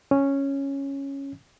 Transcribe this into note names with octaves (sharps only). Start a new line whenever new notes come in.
C#4